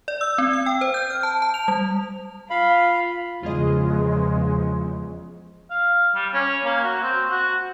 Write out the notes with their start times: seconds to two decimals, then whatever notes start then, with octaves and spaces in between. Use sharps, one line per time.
0.08 D5
0.21 E6
0.38 C4
0.53 E6
0.66 G5
0.81 C5
0.94 G6
1.10 F6
1.23 A5
1.42 A5
1.54 F7
1.68 G3
2.50 F4 F5 B5
3.43 E2 C#3 F3 G#3 F4 G#4 D#5
5.71 F5
6.15 G3
6.34 C#4
6.65 A#3
6.83 F#4
7.02 C4
7.30 F#4